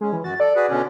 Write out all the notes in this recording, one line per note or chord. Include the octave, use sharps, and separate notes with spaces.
G#3 C#4
E3
F#2 F#4 A6
A4 D5
F#4 G#4 B4
B2 D3 C#4